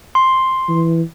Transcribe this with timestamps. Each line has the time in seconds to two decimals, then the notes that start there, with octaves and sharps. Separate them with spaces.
0.15 C6
0.68 E3